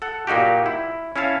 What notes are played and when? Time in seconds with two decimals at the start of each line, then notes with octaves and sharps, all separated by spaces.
0.02 A4 F#5
0.27 A#2 A#3 D#4 F#4 G4
0.66 E4
1.16 C#4 E4 C#5 F5 A5